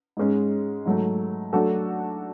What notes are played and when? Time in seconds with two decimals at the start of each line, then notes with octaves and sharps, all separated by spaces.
0.17 G#2 G#3 C#4
0.86 G#2 F#3 A3
1.53 F#3 A3 D4 F#4 A4